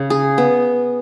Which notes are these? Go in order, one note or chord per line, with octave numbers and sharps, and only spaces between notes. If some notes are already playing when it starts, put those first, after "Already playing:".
Already playing: C#3
G#4
B3